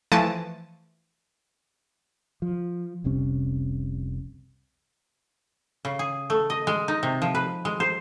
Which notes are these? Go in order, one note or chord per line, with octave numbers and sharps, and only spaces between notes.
E3 F3 A3 A5 D7 D#7
F3
F1 C2 C3 C#4
C#3
G#4
A3
D#5
G#3
D#4
C3
F3
B4
G#3
C5